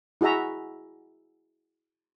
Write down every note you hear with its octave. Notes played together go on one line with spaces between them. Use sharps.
E4 F#4 G#4 E5 A#5